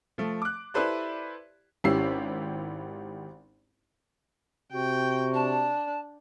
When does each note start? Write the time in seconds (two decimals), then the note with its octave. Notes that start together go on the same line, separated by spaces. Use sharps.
0.18 F3 A3
0.42 D6 F#6
0.74 E4 G4 A4 B4 C5 D5
1.84 G#1 C#4 E4 G4 E6 C7
4.72 C3 F#4 G5
5.34 D4 A5